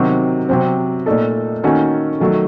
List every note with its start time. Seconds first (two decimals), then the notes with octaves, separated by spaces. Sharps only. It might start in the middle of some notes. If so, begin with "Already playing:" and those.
Already playing: C3 D#3 F#3 C4 F#4
0.49 C3 F#3 C4
1.06 A#2 A3 D#4 A4
1.63 D#3 A#3 C#4 F#4 A4
2.20 D#3 F#3 A3